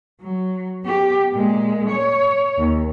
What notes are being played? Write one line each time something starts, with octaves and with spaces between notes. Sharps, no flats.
F#3
B3 G4
A#2 G#3
C#5
D#2